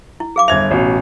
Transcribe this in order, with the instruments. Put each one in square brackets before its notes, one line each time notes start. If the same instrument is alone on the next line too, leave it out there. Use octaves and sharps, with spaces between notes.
[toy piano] E4
G#4 F5 D6
[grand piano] G1 G#6 F7 [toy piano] E5
[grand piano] A1 B2